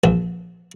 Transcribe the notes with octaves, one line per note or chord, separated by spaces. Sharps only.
A#1